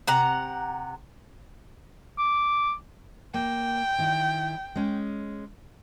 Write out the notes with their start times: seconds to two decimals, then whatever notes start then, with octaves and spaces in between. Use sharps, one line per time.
0.07 C3 F#5 A#5
2.19 D6
3.34 A#3 G5
3.98 D#3 E4
4.76 G#3 C#4